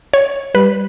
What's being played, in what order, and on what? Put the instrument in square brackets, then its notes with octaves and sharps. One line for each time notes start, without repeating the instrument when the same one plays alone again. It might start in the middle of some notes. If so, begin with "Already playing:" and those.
[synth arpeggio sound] C#5
[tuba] G3 [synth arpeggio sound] B4